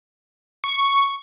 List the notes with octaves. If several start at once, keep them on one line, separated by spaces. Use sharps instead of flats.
C#6